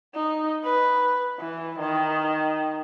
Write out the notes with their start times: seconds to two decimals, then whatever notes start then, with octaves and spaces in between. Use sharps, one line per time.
0.15 D#4
0.65 B4
1.40 E3
1.79 D#3